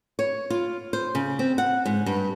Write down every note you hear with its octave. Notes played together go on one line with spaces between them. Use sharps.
C#5
F4
C5
C#3
C4
F#5
G#2
G2